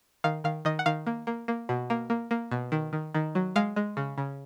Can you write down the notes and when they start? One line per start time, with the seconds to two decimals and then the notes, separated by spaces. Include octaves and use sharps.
0.24 D#3 F5
0.44 D#3 F5
0.65 D#3 D#5
0.79 F#5
0.86 D#3 F5
1.07 A#3
1.27 A#3
1.48 A#3
1.69 B2
1.90 A#3
2.10 A#3
2.31 A#3
2.51 B2
2.72 D#3
2.93 D#3
3.14 D#3
3.35 F#3
3.56 G#3 F5
3.76 G#3
3.97 C#3
4.18 C#3